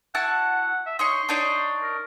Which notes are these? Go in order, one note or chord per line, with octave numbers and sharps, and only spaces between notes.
E4 F#4 F#5 A5
E5
D#4 C#5 C6 C#6
D4 D#4 C#5
A#4